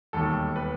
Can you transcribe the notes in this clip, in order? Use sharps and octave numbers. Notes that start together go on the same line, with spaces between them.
E1 D#2 D#3 G3 A4
B4